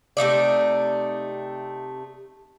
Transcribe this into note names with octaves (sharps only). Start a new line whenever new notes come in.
C3 A3 D#4 D5